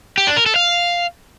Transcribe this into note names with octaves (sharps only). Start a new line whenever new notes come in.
G4
D4
A#4
A4
F5